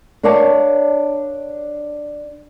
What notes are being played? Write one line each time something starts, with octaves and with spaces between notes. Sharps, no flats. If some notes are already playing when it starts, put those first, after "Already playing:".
D4 A#4 C#5 D5 F5 A5